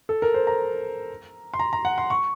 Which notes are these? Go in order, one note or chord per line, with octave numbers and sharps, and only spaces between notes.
A4
A#4
C5
A#5
C6
A#5
A#5
F#5
C6
C#6